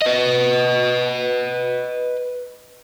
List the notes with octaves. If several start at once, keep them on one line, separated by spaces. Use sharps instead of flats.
B4 D#5